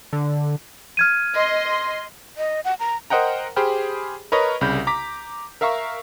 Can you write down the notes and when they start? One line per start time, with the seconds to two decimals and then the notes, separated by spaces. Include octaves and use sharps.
0.13 D3
0.97 F6 G#6 D#7
1.34 D#5 C6
2.37 D#5
2.65 F#5
2.80 A#5
3.10 A#4 C5 D#5 F#5 G5 A#5
3.56 G4 G#4 C5 G5 B5 F6
4.32 A#4 B4 C#5 D#5 A#5
4.61 C2 C#3 B5 G6
4.87 A#5 D6 B6
5.61 A#4 E5 F5 A#5 C#6 E6